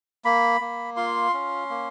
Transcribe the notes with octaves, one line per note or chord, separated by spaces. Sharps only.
A#3 B5
A#3
F4 C6
C#4
A#3